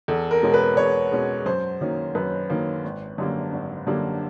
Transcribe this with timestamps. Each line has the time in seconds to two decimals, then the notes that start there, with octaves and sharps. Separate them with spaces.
0.08 E2 A4
0.31 A#4
0.43 B2 G#3 C#4
0.54 B4
0.77 E2 C#5
1.12 B2 G#3 C#4
1.46 F#2 C5
1.81 D#3 F#3 A#3 C#4
2.15 F#2 B4
2.50 D#3 F#3 A#3 C#4
2.84 G#1
3.18 F#2 D3 G3 A#3
3.53 G#1
3.87 F#2 D3 G3 A#3